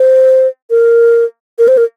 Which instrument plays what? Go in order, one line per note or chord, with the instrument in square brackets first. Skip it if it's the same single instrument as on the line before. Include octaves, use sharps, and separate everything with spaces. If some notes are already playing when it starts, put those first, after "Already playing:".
Already playing: [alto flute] C5
A#4
A#4
C5
A#4